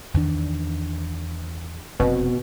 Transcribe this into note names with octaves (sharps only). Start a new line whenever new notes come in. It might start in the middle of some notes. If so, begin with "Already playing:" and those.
E2 D#3 D4
F1 B2 B3 C4